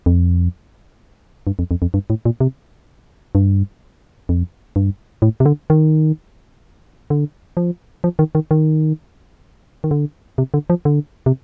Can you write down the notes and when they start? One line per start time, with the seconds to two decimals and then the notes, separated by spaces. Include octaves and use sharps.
0.06 F2
1.47 G2
1.59 F2
1.71 F2
1.82 F2
1.94 G2
2.10 A2
2.25 A#2
2.40 C3
3.35 G2
4.29 F2
4.76 G2
5.22 A2
5.40 C3
5.46 D3
5.70 D#3
7.10 D3
7.57 F3
8.04 F3
8.19 D#3
8.35 D#3
8.51 D#3
9.84 D#3
9.91 D3
10.38 C3
10.54 D3
10.70 F3
10.85 D3
11.26 C3